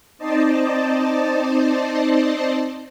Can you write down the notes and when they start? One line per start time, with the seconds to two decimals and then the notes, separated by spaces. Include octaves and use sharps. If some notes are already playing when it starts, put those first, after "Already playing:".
0.18 C4 D#4 C5 D5 D#5 A5